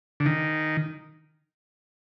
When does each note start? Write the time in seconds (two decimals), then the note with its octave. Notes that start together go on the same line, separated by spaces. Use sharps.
0.20 D3
0.26 D#3